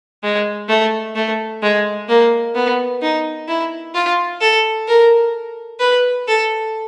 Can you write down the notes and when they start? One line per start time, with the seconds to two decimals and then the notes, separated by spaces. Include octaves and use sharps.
0.23 G#3
0.69 A3
1.15 A3
1.63 G#3
2.09 A#3
2.55 B3
3.02 D#4
3.48 E4
3.94 F4
4.41 A4
4.88 A#4
5.80 B4
6.27 A4